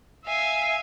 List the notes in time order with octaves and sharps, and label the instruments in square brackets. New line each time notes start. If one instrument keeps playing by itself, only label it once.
[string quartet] E5 F5 G#5